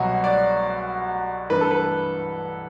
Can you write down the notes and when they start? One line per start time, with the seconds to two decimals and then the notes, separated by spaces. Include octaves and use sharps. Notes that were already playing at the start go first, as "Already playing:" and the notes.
Already playing: C2 B2 F#3 F#4
0.24 D5
1.50 G2 E3 B4
1.61 A4
1.71 B4